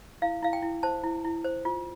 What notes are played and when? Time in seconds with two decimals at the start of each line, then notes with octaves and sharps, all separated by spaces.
0.22 E4 F5
0.42 E4 F5
0.53 G5
0.62 E4
0.83 C5 A5
1.04 E4
1.25 E4
1.44 C5
1.65 F4